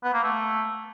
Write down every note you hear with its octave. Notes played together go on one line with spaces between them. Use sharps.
B3
A#3
A3